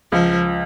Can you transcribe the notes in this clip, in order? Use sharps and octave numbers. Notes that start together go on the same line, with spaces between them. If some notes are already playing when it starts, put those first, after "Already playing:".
C#2 F3